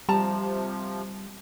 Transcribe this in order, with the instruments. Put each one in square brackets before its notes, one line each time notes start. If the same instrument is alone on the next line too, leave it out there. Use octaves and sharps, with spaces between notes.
[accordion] C3 F3 [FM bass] G3 [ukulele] A5 A#5